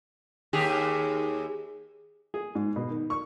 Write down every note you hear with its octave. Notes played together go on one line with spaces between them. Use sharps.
D#2 G4 G#4
G#4
G#2
B2
D#3
C#6